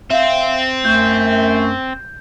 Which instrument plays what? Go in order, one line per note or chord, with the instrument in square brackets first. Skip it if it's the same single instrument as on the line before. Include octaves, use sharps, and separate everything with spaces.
[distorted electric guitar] C4 [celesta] E5 F5
[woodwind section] F#2 A3 [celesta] G6